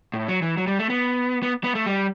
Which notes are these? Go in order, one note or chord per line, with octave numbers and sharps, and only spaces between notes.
A2
F#3
E3
F#3
G3
A3
B3
B3
B3
A3
G3